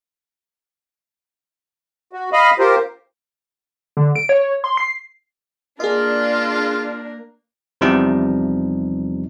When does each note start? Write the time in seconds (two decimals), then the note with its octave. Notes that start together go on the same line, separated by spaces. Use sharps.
2.13 F#4
2.33 D#5 F5 B5
2.59 F4 G4 A#4 C5
3.97 D3
4.16 D7
4.29 C#5
4.64 C6
4.77 C7
5.80 A#3 D4 F4 G#4 A#4 D#5
7.81 E2 C3 F3 G3 D#4